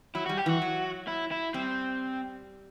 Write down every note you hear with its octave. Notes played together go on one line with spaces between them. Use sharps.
F#3 E4
G3 F#4
G4
E3 F#4
F#3
E4
E4
G3 C4